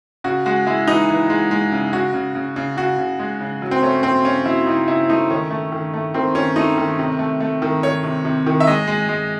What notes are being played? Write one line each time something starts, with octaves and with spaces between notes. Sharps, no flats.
C#3 F#4
G#3 F#4
G#3 E4
E3 D#4
E3
G#3
G#3
C#3
C#3 F#4
C#3
C#3
C#3
C#3 F#4
C#3
G#3
C#3
F#3
C4
A3 C#4
F#3 C4
C#3 C#4
F#3 E4
C#3 D#4
C#3 E4
A3 D#4
D#3 C#4
A3
D#3
A3
D#3 C4
D#3 C#4
A3 D#4
D#3
C3
A3
A3
D#3
D#3 C#5
C3
C3
D#3
E5
G#3 D#5
G#3
G#3